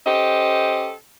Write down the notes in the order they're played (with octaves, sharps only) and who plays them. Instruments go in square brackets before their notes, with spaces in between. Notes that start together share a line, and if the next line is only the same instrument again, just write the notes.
[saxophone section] C#4 G4 A4 C5 D#5